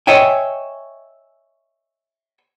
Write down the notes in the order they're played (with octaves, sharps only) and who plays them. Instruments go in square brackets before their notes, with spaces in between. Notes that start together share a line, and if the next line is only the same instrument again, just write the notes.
[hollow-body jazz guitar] C#5 D#5 E5 G5 G#5